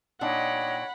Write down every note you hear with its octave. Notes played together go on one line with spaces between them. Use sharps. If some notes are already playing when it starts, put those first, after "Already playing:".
A#2 D4 D#4 C#5 D#5 F#5 G5 B5